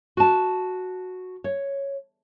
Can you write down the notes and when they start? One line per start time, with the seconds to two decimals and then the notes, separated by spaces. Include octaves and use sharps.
0.17 F#4 A5
1.44 C#5